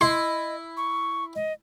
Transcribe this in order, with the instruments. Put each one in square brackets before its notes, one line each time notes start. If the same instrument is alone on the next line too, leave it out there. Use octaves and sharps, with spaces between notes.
[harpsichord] E4 [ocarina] D#5 [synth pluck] C6
[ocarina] C#6
D#5